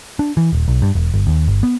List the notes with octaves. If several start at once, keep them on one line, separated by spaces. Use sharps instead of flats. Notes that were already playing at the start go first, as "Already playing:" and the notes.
D4
E3
D#1
B1
G2
E1
G1
D#2
G1
B3